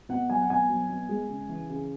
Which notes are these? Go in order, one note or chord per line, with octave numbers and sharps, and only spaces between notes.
B2 F#5
F#3 G#5
F#5
B2 G#5
F#3
B2
G#3
C#3
E3
C#3